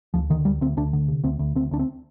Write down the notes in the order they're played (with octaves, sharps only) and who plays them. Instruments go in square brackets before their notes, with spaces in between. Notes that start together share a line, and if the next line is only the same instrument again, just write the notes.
[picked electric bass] D2 F3
D3 D#3
D2 G3
D2 C4
D2 D4
D3
C3
D2 C4
D2
D2 C4
D2 D4
C4